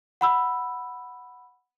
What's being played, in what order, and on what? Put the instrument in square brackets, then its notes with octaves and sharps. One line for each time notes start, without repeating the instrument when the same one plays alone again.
[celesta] F#5 B5 E6